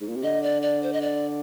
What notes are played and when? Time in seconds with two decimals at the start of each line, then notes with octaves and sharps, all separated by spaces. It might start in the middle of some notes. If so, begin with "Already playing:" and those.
0.01 G#2
0.08 A#2
0.16 C3
0.23 D3 D#5
0.43 D5
0.62 D5
0.83 C5
0.93 D#5
1.02 D5